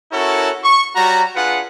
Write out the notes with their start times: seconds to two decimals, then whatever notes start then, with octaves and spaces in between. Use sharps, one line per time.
0.12 C#4 E4 F#4 A4 A#4 C#5
0.63 C#6
0.95 G3 F#4 C#5 A#5
1.36 D4 F4 G#4 B4 F#5